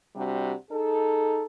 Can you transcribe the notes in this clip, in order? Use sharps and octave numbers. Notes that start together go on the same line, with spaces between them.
C3 G3 D4 F#4
D#4 G#4 A4